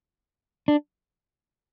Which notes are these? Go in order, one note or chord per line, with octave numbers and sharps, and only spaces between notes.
D4